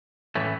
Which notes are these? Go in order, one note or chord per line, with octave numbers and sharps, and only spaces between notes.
A2 E3 A3 C#4